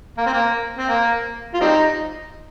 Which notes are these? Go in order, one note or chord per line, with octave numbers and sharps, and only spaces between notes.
A#3
C4
A#3
C4
A#3
F4
G3 C4 D#4